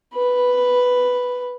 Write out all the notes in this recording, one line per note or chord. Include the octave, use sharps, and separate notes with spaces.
B4